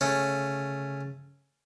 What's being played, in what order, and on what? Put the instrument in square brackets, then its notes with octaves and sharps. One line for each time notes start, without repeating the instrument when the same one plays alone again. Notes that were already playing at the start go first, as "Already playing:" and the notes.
[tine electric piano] C#3 [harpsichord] A3 C#4